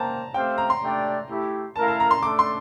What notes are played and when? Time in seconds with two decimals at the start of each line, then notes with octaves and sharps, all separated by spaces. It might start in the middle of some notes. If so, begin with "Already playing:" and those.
Already playing: A#3 C5 G5 A5 A#5
0.34 A3 C4 G4 C5 F5 G5
0.58 A#5
0.70 C6
0.81 A3 D4 G4 D5 G5
1.29 A3 E4 G4
1.76 A3 E4 A#4 F5 A5
1.88 A5
2.00 A#5
2.11 C6
2.23 A3 D4 A4 D6
2.39 C6